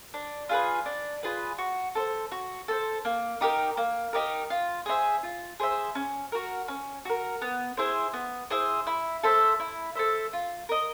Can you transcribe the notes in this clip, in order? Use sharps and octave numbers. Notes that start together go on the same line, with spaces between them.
D4
F4 G#4 B4
D4
F4 G#4 B4
F#4
A4 C5
F#4
A4 C5
A#3
D#4 G4 A#4
A#3
D#4 G4 A#4
F4
G#4 C5 E5
F4
G#4 C5 E5
C#4
F#4 A#4
C#4
F#4 A#4
B3
E4 G#4 C5
B3
E4 G#4 C5
E4
A4 C5 E5
E4
A4 C5 E5
F4
A#4 D#5